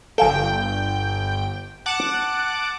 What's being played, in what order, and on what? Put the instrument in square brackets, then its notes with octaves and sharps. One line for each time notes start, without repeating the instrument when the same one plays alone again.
[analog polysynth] G1 G5 [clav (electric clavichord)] A4 F5 G#5
[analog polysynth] F#5 A5 D6